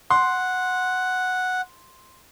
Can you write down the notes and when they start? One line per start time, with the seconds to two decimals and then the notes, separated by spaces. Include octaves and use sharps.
0.10 F#5 C6